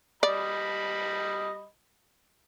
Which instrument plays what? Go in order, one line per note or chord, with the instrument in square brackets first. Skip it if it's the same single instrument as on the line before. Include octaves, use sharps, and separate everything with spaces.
[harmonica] G3 D#5 B5 [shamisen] D5